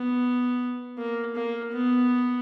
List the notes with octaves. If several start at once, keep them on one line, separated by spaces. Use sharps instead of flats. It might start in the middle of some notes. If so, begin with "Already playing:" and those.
Already playing: B3
A#3
A#3
B3